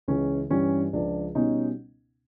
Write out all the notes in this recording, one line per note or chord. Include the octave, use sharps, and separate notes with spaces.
C#2 C#3 E3 G#3 C#4
G2 E3 G3 C#4
C#2 C#3 F3 D4
B2 G3 B3 C#4 D#4